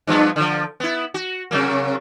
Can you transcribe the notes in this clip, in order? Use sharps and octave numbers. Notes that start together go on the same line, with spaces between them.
G2 F3 B3
D3 F3
B3 E4
F#4
C3 F#3 A#3